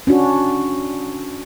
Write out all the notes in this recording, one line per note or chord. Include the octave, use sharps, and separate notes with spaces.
C#4 D4 F#4